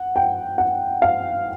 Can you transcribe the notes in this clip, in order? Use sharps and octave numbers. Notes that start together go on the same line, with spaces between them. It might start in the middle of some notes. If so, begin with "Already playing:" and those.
Already playing: F#5
G5
F#5
F5